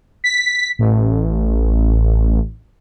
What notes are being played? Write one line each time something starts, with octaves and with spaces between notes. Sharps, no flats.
B6
A1